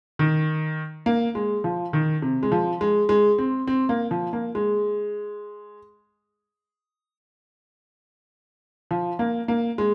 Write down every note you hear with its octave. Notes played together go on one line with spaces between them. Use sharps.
D#3
A#3
G#3
F3
D#3
C3
G#3
F3
G#3
G#3
C4
C4
A#3
F3
A#3
G#3
F3
A#3
A#3
G#3